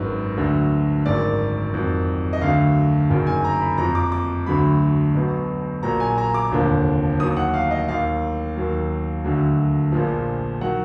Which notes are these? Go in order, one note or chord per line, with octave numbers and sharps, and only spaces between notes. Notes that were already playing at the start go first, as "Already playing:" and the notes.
Already playing: G#1 F#2 D#3 B4
D2 D3 F#3
G#1 F#2 D#3 F#3 D5
F2 D#3 F#3
D#5
D2 D3 F#3 F5
F#1 F#2 D#3 F#3
G#5
A#5
B5
F2 F3 A#5
D6
D6
D2 D3 F#3 B5
B1 B2 F#3
A#1 A#2 F#3 A#5
G#5
A#5
D6
F1 D#2 D3 F3
D#2 D#3 F#3 D#6
F#5
F5
D#5
D#2 D#3 F#3 F5
D#2 D#3 F#3
D2 D3 F#3
A#1 A#2 F3
D#3 F#3 F#5